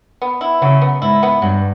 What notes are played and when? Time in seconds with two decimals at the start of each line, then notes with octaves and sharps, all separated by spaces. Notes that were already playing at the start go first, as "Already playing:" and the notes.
0.22 B3
0.41 E4
0.61 C#3 F#3
0.81 B3
1.02 G#2 E4
1.23 B3
1.42 G2 F#3